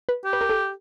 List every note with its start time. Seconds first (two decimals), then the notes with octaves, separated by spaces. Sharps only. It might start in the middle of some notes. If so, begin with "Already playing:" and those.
0.09 B4
0.25 G4
0.33 B4
0.41 A#4
0.49 A4